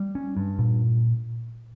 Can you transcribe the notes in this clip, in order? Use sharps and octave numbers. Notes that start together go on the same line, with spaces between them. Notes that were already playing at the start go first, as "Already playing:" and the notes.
Already playing: G3
C#4
G2
A#2